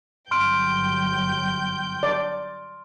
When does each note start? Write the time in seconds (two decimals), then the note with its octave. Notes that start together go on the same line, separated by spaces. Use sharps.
0.31 G1 F#3 G5 C6 F6 G6 D7
2.03 D5